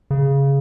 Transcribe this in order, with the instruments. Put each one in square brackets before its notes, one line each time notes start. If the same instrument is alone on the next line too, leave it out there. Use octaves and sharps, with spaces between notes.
[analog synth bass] C#3